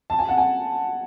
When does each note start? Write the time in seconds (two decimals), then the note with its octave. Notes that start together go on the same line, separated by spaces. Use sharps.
0.10 A5
0.19 G#5
0.29 F#5
0.38 G#5